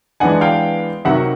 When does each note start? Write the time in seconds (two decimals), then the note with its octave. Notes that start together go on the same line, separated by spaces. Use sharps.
0.20 E3 G#3 B3 D4 F#5 G#5
0.41 F5 G5
1.05 C3 D#3 F#3 E5 F#5